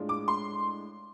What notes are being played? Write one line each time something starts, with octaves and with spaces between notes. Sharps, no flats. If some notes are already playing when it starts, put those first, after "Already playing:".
Already playing: A2 G#3 D4 F4
D6
C6